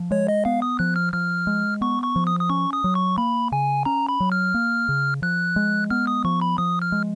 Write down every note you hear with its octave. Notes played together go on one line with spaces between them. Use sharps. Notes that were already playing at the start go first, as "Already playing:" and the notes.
Already playing: F3
G#3 C#5
D#5
B3 F5
D#6
F3 F#6
F6
F3 F6
G#3
B3 C#6
C#6
F3
D#6
D#6
C#4 C#6
D#6
F#3
C#6
A#3 B5
C#3 G#5
C#4 A#5
B5
F#3
F6
A#3
C#3
F3 F#6
G#3
B3 F6
D#6
F3 C#6
B5
F3 D#6
F6
G#3